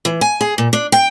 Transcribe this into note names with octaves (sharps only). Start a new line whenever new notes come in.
E3
G#5
G#4
A#2
D4
G5